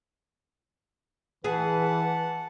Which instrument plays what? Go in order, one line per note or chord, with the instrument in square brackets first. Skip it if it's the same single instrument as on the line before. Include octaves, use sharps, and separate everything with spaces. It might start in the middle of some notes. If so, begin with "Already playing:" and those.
[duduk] E3 [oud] G#4 [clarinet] B4 [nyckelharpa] F#5 A5